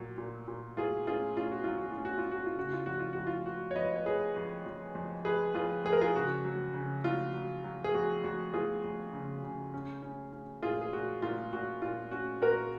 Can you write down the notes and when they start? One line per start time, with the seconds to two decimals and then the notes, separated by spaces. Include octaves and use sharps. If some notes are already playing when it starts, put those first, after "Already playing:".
Already playing: A#2 F#3
0.18 A#2
0.48 A#2
0.77 F#3 F4 G#4
1.07 C#4 F4 G#4
1.37 C#4 F4
1.51 F#4
1.64 F#3 F4
1.78 F#4
1.91 F4
1.98 C#4
2.05 F#4
2.18 F4
2.26 C#4 F#4
2.46 F4
2.56 C#3 F#4
2.73 F4
2.86 F2 F#4
2.99 F4
3.13 F2 F#4
3.27 F4
3.46 F3 F#4
3.71 C#5
3.76 F2 B4 D#5
3.96 C#5
4.06 F3 G#4 B4
4.36 F2
4.66 F2
4.95 F2
5.25 F3 G#4 B4
5.55 F2 F4 G#4
5.85 F2 G#4
5.93 A#4
6.01 F4 G#4
6.16 C#3 F#4
6.45 F#3
6.74 C#3
7.04 F#3 F4
7.34 F#3
7.64 F#3
7.84 G#4
7.94 F2 F#4
8.24 F2 F#4
8.54 F2 F4 G#4
8.84 F2
9.13 C#3
9.44 C#3
9.74 C#4
10.02 C#4
10.33 C#4
10.62 A#2 F4 G#4
10.81 G#4
10.93 A#2 F#4
11.22 A#2 F4
11.53 A#2 F#4
11.82 A#2 F4
12.11 C#4 F#4
12.42 A#2 F#4 A#4